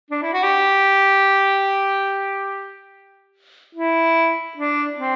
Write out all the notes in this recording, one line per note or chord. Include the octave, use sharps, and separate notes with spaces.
D4
E4
F#4
G4
E4
D4
C4